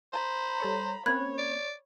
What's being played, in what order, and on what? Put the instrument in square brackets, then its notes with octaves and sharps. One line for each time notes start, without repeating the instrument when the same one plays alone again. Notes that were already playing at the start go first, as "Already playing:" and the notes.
[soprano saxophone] C5 [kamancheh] A#5 B5
[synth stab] G3 A4 C#5
[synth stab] A#3 C4 C#4 [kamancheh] C#5 [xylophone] B5 F#6 G#6
[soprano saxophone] D5